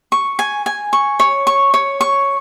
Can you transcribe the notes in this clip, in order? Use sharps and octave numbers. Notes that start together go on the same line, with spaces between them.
C#6
G#5
G#5
C#6
C#5
C#6
C#5
C#6